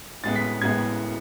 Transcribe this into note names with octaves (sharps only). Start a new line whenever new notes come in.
A2 G#3 B3 A6
B6
A2 G#3 B3 G#6